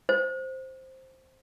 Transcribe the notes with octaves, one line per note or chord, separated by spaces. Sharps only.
C5